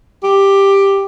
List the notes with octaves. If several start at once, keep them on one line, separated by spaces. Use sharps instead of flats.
G4